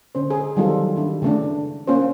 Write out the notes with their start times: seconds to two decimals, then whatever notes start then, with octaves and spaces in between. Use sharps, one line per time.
0.15 D3 C#4 C5
0.30 G#4
0.57 D#3 F#3 G3 C4 F4 A4
0.96 D#3 D4 E4
1.22 C#3 E3 A3 C#4 D4
1.87 A#3 C#4 F4 C5